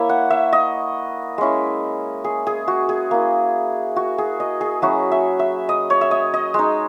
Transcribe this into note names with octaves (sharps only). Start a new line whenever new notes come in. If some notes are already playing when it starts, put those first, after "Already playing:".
Already playing: A#3 E4 C#5 E5
F#5
E5
D#5
G#3 C#4 E4
G#4
G#4
F#4
G#4
A#3 E4
F#4
G#4
D#5
G#4
F#3 C#4 E4 F#4
E5
E5
D#5
C#5
E5
D#5
D#5
G#3 D#4